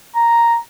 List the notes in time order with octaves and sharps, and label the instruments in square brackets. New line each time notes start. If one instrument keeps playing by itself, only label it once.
[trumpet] A#5